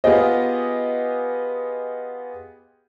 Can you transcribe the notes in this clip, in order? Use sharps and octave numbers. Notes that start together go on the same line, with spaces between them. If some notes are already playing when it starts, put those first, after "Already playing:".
B3 F4 G4 G#4 D#5